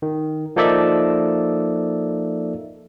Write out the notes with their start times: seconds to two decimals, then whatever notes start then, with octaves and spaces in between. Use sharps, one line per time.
0.02 D#3
0.56 F3 A#3 D#4 A4 D5 E5